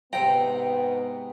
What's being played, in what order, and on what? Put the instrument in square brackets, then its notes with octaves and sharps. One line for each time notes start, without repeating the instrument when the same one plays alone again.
[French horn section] G#2 B3 [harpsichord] C3 A#5 [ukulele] G5